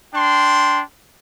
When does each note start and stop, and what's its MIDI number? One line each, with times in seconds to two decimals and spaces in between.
0.14 0.81 62
0.14 0.81 79
0.14 0.81 84